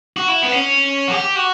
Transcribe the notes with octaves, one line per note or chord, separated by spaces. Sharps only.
F#4
E4
B3
C#4
F#4
G4
F#4